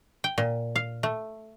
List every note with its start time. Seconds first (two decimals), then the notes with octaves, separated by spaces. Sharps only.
0.24 G5
0.38 A#2
0.76 F5
1.03 A3